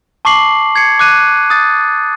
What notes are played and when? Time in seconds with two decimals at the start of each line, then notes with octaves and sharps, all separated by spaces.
0.25 A5 C#6 D6 C7 F#7
0.76 G#6 C7 C#7
0.99 D6 F#6 D#7
1.50 D#6 A6